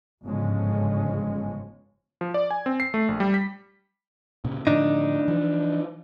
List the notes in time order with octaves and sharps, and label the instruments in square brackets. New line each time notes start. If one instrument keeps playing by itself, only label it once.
[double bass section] G1 G#2 C#3 F3 G#3 C#4
[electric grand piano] F3
D5
G#5
C4
C7
A3
A#1
G3
B6
[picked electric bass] A#2 C#3
[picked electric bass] A2 D3 F3 [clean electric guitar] D4 D#4
[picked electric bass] E3 F3